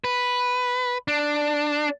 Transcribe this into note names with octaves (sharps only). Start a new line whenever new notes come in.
B4
D4